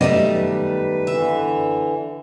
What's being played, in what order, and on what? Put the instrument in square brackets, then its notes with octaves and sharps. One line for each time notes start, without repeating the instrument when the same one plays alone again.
[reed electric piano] F#2 B3 D5 [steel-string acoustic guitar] D#3 G3 A3 [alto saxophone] D#5
[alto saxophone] B4
[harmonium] D3 E3 [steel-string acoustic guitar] E5